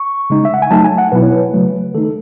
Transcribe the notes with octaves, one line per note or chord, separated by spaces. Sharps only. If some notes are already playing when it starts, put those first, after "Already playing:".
Already playing: C#6
C#3 G#3 D#4
E5
F#5
G#5
F#3 A3 D#4 A5
G#5
F#5
B2 F#3 B3 E4 B4
C#5
B4
C#3 F#3 A3
D#3 A3 D#4 A4
A4